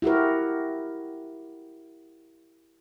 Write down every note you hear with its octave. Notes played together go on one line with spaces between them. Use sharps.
E4 F#4 G4 A#4